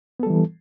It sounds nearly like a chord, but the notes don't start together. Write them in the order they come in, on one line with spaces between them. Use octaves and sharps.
B3 A4 G3 E3